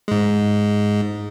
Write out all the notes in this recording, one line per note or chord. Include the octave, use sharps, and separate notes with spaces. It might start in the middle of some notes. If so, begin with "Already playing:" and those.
G#2 G#3